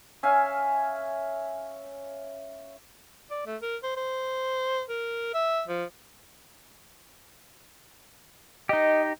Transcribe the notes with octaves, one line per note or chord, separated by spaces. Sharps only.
C#4 E5 F5 G#5
D5
A3
A#4
C5
C5
A#4
E5
F3
D#4 G4 D#5